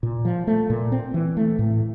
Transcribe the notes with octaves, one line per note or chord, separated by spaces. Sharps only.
A#2
F3
A3
A#2
C4
E3
A3
A2